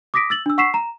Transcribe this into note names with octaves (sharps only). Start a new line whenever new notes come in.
D6 D#6 A#6 B6 D7
E6 A6 F#7
D4 E6
F#5 C#6 E6 B6 C7 E7
A#5 E7